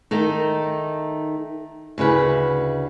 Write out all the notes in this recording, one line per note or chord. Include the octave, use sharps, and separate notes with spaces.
D#3 A3 D#4
D2 C#3 E4 B4